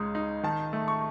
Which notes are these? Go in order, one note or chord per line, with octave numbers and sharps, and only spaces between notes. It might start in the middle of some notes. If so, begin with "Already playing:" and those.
Already playing: C#2 C#3 G#3 D#4
D#4
D#3 A5
A3
C#6